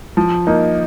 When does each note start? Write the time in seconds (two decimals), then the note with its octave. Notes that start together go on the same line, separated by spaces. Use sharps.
0.17 F3
0.47 A#3 D#4